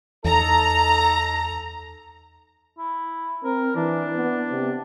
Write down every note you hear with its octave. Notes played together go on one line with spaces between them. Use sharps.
E2 D#4 A4 A#5
E4
C4 A#4
E3 D4
B3
C3